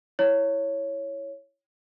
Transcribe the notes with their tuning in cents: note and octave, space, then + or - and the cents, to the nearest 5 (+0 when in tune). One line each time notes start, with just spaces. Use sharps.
E4 +0 C#5 +0